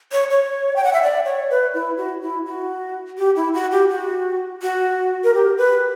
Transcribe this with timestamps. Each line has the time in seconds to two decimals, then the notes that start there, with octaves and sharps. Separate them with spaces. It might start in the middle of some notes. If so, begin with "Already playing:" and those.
0.12 C#5
0.30 C#5
0.76 G5
0.84 F#5
0.93 E5
1.02 D5
1.25 C#5
1.50 B4
1.74 E4
1.97 F#4
2.21 E4
2.46 F#4
3.18 G4
3.36 E4
3.54 F#4
3.71 G4
3.90 F#4
4.62 F#4
5.24 A#4
5.34 G4
5.58 B4